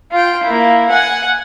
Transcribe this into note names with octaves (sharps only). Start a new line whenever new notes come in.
F4 G5
A#3 E4
F#5 G#5